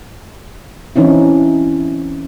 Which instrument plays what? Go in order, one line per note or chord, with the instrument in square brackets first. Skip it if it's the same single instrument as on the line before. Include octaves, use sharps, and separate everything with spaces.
[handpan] E3 C4 C#4 D#4 E4